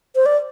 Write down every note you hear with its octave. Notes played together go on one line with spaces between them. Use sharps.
C5
D5